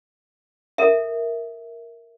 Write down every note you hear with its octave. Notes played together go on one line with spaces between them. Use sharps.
A4 A#4 E5